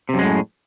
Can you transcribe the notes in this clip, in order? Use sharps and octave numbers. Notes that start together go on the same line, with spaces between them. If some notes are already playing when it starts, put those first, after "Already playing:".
F#2 A2 C3 G#3